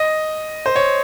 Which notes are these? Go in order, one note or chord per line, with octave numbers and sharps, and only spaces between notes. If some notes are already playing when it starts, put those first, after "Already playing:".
Already playing: D#5
C5
C#5